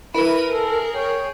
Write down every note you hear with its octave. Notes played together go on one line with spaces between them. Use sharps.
E4 A#4 B4 D#7
G#4 A4
C#5 G5